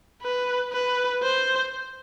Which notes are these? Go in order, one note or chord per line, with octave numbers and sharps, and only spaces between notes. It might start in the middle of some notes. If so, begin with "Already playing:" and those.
B4
B4
C5